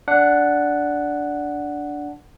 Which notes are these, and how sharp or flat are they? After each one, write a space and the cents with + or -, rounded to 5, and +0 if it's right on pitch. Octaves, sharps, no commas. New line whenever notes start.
D4 -10 F#5 +0